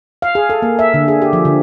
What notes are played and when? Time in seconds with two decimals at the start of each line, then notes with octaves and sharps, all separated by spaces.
0.22 F5
0.35 G#4
0.50 A4
0.62 A#3
0.79 E5
0.94 D3
1.08 G#4
1.22 G4
1.33 F3
1.45 D3